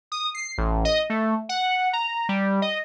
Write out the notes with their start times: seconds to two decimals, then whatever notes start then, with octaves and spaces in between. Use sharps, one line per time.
0.12 D#6
0.35 C7
0.58 A1
0.85 D#5
1.10 A3
1.49 F#5
1.93 A#5
2.29 G3
2.62 D#5